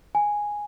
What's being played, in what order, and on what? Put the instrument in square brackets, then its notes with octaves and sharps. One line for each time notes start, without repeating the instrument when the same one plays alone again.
[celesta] G#5